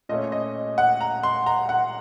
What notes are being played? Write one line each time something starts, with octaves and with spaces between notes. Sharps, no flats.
A#2 A3 C#4 D#5
D#5
F#5
A#5
C6
A#5
F#5